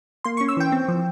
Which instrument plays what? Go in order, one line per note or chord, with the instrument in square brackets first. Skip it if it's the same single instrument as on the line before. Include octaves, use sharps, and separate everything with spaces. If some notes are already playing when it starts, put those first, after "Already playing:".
[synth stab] A#3 C6
C#6
C#4
E6
E3 G5
C4
F3